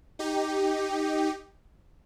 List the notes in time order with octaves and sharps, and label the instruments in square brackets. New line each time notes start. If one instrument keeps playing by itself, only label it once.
[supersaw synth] D#4 G4